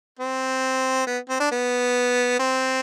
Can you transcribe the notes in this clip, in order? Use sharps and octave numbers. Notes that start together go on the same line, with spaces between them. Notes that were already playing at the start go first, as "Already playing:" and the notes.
C4
B3
C4
D4
B3
C4